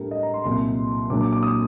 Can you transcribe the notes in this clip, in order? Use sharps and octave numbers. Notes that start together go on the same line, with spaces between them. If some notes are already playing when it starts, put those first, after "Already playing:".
Already playing: A2 G3 D4 A#4
D#5
A#5
C6
C2 A#2 F#3 C6
A#2 F#3 A#3 D4 D6
D6
D6
D#6